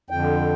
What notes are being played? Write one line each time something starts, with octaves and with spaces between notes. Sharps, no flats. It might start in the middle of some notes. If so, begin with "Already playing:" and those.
F2 D3 G5